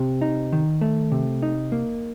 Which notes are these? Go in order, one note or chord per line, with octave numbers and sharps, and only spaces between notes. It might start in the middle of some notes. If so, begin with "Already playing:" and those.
Already playing: C3
D#4
D#3
A3
C3
D#4
A#3